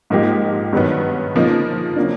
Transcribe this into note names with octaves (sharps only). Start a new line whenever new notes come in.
G#2 F3 A#3 D#4 G4
G2 D#3 F#3 B3
C#3 F3 A#3 D#4
C#3 F#3 A#3 D4